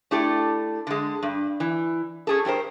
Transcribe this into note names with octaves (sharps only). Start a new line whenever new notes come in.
A3 D4 E4 G4 A4
D3 G#3
G2
E3
C#4 G#4 A4
G2 G4 A#4 C5